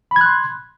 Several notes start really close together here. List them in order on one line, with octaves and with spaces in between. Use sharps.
B5 G#6 F#6 C6